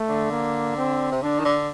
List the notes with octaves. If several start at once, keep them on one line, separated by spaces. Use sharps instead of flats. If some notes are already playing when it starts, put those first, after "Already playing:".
Already playing: A3
D3
A#3
C4
C3
D3 D4
D#3
D3